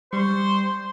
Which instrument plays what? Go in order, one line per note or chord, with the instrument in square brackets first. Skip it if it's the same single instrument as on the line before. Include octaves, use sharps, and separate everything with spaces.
[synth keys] G3 C#6 [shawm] C5